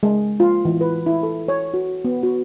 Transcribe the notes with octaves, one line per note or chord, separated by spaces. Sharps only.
G#3
F4
E3
B4
E4
A4
C#5
F#4
B3
F#4